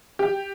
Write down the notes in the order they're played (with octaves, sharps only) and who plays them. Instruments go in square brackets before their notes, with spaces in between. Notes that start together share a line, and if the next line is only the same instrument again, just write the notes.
[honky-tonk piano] G4